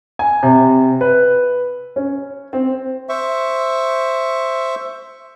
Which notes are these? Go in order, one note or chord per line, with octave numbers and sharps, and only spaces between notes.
G#5
C3
B4
C#4
C4
C5 E5 C#6